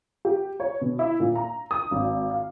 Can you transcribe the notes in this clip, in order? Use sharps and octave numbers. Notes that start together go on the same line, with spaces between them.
G4
C#5
B2
E4
A#2
A#5
D#6
G#1
F5